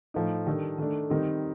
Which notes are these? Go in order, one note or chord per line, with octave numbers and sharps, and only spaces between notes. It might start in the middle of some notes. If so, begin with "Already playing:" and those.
A2 F3 A3 D#4
D#3 G3 D4 A4
D#3 A3 D4
D#3 G3 C4 D#4